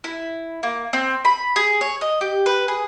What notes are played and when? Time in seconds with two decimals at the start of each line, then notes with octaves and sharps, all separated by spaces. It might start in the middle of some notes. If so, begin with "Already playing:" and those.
0.04 E4
0.63 A#3
0.93 C4
1.25 B5
1.56 G#4
1.81 C#5
2.01 D#5
2.21 G4
2.46 B4
2.68 G#4